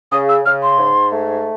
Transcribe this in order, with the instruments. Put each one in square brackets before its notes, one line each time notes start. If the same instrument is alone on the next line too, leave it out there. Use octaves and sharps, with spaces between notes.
[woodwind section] C#3 [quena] D#6
[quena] E6
[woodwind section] C#3 [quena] F6
[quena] C6
[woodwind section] G#2
A3